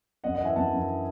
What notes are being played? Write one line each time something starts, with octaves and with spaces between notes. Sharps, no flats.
F#2 D#5 F#5
D#5 F#5
E3 E5 G#5
F#2 F#5 A5
F#2